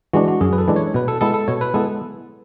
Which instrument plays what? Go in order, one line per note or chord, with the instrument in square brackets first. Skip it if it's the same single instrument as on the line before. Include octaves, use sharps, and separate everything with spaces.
[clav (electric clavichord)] E3 G#3 D4 [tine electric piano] F#4
[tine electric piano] F#4
[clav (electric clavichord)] F#2 [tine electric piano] G#4
[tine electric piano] B4
A4
[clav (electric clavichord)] E3 G#3 D4
[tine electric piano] C#5
[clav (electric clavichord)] B2 [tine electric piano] B4
[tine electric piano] A4
[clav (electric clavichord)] G#3 B3 E4 [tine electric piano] A4
[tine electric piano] A4
[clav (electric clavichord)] B2 [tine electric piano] C#5
[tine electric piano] B4
[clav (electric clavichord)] G#3 B3 E4 [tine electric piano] A4